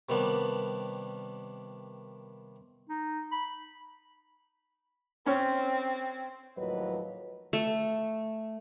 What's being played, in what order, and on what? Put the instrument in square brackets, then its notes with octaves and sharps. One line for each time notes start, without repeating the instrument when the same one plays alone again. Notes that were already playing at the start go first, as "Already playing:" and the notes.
[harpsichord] C3 D#3 G3 A#3 B3 D4
[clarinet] D#4
B5
[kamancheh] C4 [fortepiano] C#4 C#5 C#6
[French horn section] D#2 A2 F3 F#3 B4 D#5
[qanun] A3